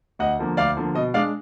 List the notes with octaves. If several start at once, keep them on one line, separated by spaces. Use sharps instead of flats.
D2 D#5 F#5
D3 F3 A#3
D2 D5 F5
D3 F3 A#3
B2 D#5
G#3 D4 D5 F5